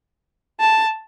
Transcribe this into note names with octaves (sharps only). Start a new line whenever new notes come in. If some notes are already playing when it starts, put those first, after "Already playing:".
A5